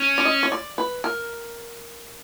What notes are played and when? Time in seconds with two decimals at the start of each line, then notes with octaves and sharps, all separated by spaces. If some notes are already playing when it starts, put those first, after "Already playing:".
Already playing: C#4
0.18 D5
0.25 D#5
0.43 C#5
0.52 D5
0.78 B4
1.04 A#4